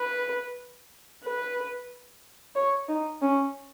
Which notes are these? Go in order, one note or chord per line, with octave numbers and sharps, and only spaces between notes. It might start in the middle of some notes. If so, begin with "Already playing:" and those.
Already playing: B4
B4
C#5
D#4
C#4